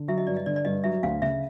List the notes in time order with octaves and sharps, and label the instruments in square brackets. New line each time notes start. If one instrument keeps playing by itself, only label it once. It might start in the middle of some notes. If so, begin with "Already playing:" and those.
Already playing: [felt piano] D3
[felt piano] F#3 [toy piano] E5
[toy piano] D#5
[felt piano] G2 [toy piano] D5
[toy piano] D#5
[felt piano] D3 [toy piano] D5
[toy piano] D5
[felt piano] G2 [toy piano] D#5
[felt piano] F#3 [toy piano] E5
[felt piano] D2 [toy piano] F5
[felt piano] C#3 [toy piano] E5